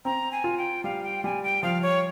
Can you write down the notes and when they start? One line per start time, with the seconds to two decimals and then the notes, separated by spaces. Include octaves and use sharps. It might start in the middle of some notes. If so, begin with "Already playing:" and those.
0.05 C4 A#5
0.32 G#5
0.44 F4
0.58 G5
0.84 G3 F5
1.03 G5
1.24 G3 G#5
1.43 G5
1.63 F3 F5
1.82 C#5